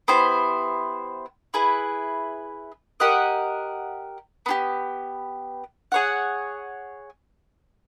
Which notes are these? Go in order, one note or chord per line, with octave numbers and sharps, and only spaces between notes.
B3 E4 G4 C5
E4 G#4 B4
G4 A#4 D#5 F#5
B3 D4 G4
G#4 C#5 F#5